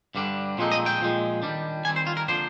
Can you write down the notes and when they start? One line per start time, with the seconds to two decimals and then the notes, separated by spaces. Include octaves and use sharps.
0.15 G2 D3 G3 D4
0.58 A#2 F3 G#3 C4 D#4
0.72 D#5
0.86 G5
1.00 A#2 F3 G#3
1.42 D#3 G3 D4
1.85 D#3 G3 C4 G#5
1.96 C5
2.07 F4
2.17 A#4
2.28 D3 F3 A#3 D4 C5